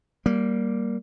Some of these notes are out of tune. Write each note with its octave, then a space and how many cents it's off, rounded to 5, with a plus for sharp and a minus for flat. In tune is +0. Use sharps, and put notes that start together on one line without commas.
G3 -10 A#3 +5